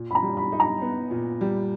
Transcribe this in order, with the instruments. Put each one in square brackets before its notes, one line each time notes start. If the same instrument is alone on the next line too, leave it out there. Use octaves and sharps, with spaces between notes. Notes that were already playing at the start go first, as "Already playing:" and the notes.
Already playing: [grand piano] A#2
[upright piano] B5
A#5
[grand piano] G3
[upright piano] B5
[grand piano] D#4
[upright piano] A#5
[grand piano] B3
A#2
G3